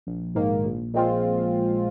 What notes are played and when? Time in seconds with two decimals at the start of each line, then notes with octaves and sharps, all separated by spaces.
0.07 A#1
0.35 G#2 D#3 A#3
0.65 A#1
0.94 A#2 G#3 C4 F4